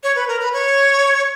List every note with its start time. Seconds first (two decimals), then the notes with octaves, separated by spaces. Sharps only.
0.03 C#5
0.16 B4
0.28 A#4
0.40 B4
0.53 C#5